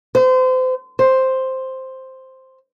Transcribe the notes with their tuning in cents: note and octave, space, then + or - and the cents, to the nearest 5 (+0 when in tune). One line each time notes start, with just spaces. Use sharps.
C5 -35
C5 +0